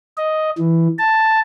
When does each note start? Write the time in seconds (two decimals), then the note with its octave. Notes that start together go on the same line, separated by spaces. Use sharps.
0.17 D#5
0.58 E3
0.99 A5